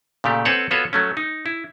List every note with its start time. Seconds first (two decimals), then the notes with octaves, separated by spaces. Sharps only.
0.24 A#2 C#3 A3 G4
0.45 C4 A4 B4 C#5 F#5
0.71 B3 F4 F#4 A4 B4 C#5
0.93 F#3 A3 C#4
1.17 D#4
1.46 E4